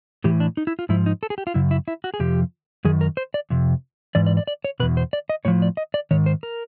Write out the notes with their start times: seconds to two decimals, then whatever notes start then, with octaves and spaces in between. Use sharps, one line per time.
0.24 A2 E3 G4
0.40 D4
0.57 D#4
0.67 E4
0.79 F4
0.89 G#2 F3 E4
1.06 D#4
1.23 A4
1.30 G#4
1.38 G4
1.47 F4
1.54 F#2 C#3 E4
1.71 E4
1.88 E4
2.04 F#4
2.14 G#4
2.20 F2 C3 F3 G4
2.85 F#2 D#3 G#4
3.01 A#4
3.17 C5
3.34 D5
3.50 F2 C3
4.15 G#2 E3 D5
4.27 D5
4.37 D5
4.47 D5
4.65 C#5
4.80 E2 B2 B4
4.97 C5
5.13 D5
5.29 D#5
5.45 A2 F3 C#5
5.62 D5
5.77 D#5
5.94 D5
6.11 G#2 D#3 C#5
6.26 C5
6.43 A#4